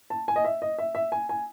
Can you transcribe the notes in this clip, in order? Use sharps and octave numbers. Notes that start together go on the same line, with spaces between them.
A5
G#5
D#5
E5
D#5
E5
E5
G#5
G#5